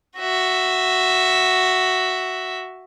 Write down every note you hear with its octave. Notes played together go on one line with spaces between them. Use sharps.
F#4 E5